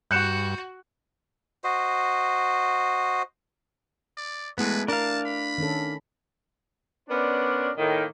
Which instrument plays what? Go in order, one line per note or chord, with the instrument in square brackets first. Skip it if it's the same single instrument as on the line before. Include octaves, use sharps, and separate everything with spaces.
[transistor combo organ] G2 [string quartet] F#4 [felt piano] F#6 [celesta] G6 C#7 E7
[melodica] F#4 C5 D#5
[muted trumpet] D5
[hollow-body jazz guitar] G#3 B3 [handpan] A3 E4 [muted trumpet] B4
[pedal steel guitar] D4 F5 [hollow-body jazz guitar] A#4 [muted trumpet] A5
[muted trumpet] B5
[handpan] D#3 C#4 A4
[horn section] B3 C#4 D4 A#4 C5 D5
A2 D#3 A#3